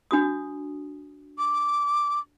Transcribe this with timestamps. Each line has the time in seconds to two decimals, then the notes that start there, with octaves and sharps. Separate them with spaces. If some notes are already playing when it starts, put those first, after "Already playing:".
0.11 D4 F#4 D#6
1.38 D6